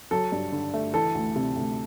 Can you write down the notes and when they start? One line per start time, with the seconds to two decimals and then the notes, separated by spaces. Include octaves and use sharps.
0.11 F#3 A4
0.32 G2
0.52 D3
0.74 A3
0.94 E3 A4
1.15 D2
1.36 C3
1.56 D2